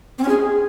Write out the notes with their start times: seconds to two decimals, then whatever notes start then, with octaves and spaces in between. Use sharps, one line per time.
0.18 C4
0.23 C#4
0.28 G#4